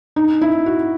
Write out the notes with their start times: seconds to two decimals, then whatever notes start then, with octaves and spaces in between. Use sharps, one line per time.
0.16 D#4
0.41 E4
0.66 F#4